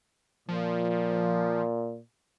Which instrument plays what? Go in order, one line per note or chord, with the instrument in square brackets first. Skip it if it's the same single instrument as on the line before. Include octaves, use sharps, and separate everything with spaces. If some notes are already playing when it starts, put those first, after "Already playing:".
[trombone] A#2 [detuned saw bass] F3